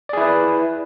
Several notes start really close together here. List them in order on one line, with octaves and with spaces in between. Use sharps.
D5 G#4 E4 B4